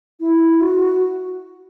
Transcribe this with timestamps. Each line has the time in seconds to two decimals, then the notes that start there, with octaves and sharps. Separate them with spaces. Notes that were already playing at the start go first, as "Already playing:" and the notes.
0.20 E4
0.61 F#4